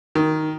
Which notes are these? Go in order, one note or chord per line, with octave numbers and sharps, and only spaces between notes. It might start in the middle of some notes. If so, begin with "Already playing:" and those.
D#3